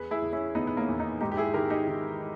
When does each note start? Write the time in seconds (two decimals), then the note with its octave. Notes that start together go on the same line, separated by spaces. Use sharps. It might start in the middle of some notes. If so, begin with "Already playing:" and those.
Already playing: E2 G#4 B4
0.11 E4 G#4
0.22 E2
0.33 C#4 E4
0.55 D#3 B3 D#4
0.67 B3
0.77 A#3 C#4
0.89 E2
1.00 B3 D#4
1.21 G#2 D#4 G4
1.32 G4
1.37 E4 G#4
1.54 D#3 G4 A#4
1.70 D#4 G4
1.87 D#3